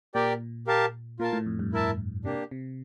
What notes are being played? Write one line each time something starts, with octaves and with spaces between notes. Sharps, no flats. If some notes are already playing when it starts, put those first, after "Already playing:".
A#2 G4 A#4 D5 G5
G4 A#4 F5 A5
A#2 F4 A#4 F5 A5
A2
F2
G2
E4 A#4 E5 A5
C3 A#3 D4 G4
C3